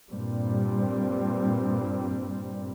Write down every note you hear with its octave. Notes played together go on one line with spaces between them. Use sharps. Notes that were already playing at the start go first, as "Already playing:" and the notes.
G2 A#2 G3 C4